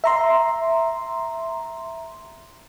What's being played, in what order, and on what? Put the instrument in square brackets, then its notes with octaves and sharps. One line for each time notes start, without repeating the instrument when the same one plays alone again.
[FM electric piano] E5 A#5 C6